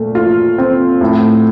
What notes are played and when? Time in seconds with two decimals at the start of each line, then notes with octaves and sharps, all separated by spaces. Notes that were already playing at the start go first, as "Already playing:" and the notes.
Already playing: A#2 A3
0.15 F4
0.58 C4
1.01 A2